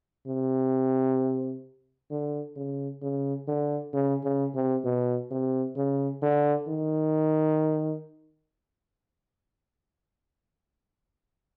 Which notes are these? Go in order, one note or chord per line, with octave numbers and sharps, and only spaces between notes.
C3
D3
C#3
C#3
D3
C#3
C#3
C3
B2
C3
C#3
D3
D#3